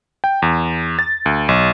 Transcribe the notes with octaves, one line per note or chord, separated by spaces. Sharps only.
G5
E2
A6
D2
B1